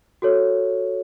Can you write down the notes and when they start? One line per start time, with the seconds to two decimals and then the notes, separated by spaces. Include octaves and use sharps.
0.22 F#4 A4 C#5